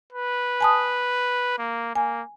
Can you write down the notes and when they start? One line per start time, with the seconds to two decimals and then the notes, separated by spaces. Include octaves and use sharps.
0.13 B4
0.61 G#5 A5 D#6
1.59 A#3
1.95 A#3 G#5